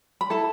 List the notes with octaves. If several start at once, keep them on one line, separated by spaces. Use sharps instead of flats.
B5
E4 A4 A5